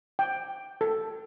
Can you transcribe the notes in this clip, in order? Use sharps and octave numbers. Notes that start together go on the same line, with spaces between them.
G5
A4